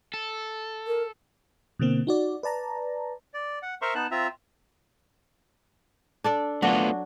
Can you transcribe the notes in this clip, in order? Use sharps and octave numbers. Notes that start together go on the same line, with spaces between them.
A4
A#4
B2 D3 A#3 C4
D#4 F#4 D5
B4 D5 A5 A#5
D5
F#5
A#4 C5 E5 A#5 C6 C#6
B3 D#4 A5 F#6
C4 F4 E5 A#5
D4 A4 D5
F#3 A3 B3 D4 F4 F#4